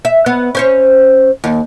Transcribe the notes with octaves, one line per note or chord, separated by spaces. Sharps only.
E5
B3
C#4 C5 C#5
D#2